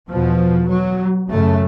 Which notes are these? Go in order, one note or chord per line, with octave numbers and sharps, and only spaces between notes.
E2 B2 F3
F#3
F#2 C#3 A3